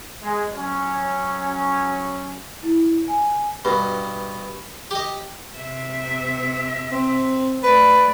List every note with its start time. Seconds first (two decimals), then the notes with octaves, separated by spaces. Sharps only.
0.23 G#3
0.54 F#3 C#4
2.63 E4
3.08 G#5
3.65 G2 B2
4.91 G4 D#5
5.55 C3 E5
6.91 C4
7.63 A3 B4 D5